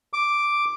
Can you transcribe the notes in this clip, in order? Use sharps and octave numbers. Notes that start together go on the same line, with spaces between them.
D6